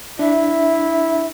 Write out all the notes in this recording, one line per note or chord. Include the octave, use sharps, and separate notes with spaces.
D4 E4 E5